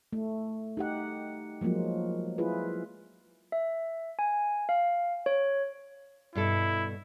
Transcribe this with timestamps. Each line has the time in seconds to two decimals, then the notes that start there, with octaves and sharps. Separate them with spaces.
0.13 A3
0.77 D#4 G4 F#5
1.61 F3 F#3 G#3 A#3 F4
2.38 E4 F4 G#4 B4
3.52 E5
4.19 G#5
4.69 F5
5.26 C#5
6.35 G2 B2 E4 A4